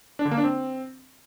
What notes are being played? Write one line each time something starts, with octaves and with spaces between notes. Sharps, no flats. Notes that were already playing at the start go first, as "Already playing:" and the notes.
D4
D3
A#3
D4
C4